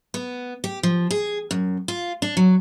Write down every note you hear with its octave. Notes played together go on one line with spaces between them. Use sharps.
B3
G4
F3
G#4
F#2
F4
D4
F#3